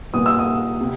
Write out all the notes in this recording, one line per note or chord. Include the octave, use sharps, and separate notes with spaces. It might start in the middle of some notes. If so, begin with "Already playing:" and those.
A#2 G3 B3 D#6
E6
D#6
C3